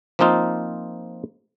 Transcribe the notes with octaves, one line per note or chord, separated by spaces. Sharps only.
F3 A#3 C4 D#4 F4